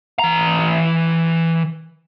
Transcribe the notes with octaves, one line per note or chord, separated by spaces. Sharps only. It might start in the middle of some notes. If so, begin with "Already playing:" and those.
E3 A#5